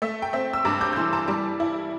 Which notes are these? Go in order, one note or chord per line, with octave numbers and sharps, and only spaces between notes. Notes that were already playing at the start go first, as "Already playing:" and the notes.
A3 E5
G5
C4 E5
E6
G2 A5 D6
D6 G6
G6
E3 C6 E6
A5 D6
G3 A5 D6
E4